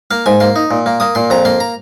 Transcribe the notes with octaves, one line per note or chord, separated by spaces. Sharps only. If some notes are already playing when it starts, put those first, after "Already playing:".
A#3 F5
G#2 G#5
A#3 C6
D#4
A#2
A#3
A#3 D#6
A#2 C6
F2 A#5
A#3 C6
A#5